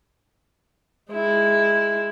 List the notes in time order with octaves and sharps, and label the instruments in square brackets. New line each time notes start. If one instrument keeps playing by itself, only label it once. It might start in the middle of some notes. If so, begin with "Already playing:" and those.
[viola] G#3 E4